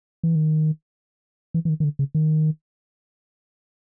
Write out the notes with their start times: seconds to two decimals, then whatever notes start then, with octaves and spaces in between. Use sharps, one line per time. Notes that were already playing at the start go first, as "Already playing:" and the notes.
0.23 E3
0.35 D#3
1.54 E3
1.65 E3
1.69 D#3
1.80 D#3
1.84 D3
1.99 C#3
2.15 D#3